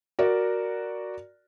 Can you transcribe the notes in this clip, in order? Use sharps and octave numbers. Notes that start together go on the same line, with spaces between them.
F#4 A#4 D5